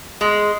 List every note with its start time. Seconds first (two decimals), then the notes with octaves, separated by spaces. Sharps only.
0.21 G#3